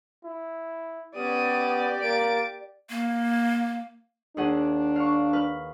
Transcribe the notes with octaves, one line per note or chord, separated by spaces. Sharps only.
E4
B3 C#4 G4 D5 D#6
A#3 A6 D7
A#3
D#2 D4 G#4 F#5
F5 C#6
B4 F6